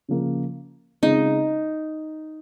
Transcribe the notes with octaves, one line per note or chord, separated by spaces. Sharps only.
C#3 F3 A#3
C#3 G#3 C4 D#4 F4